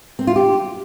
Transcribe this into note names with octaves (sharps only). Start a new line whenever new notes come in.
C4
F4
G4